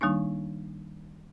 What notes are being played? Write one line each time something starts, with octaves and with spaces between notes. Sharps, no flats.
D#3 G3 A#3 D4 D#4